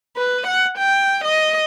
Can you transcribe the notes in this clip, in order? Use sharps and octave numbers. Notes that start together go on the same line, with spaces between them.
B4
F#5
G5
D#5